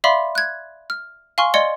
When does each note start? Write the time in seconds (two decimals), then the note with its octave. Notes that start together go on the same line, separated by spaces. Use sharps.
0.04 D5 E5 F5 B5 C6 D6
0.35 F#6 G#6
0.90 F6
1.38 F5 G#5 C6 C#6 F6
1.54 D5 D#5 C6 G#6 C#7 G7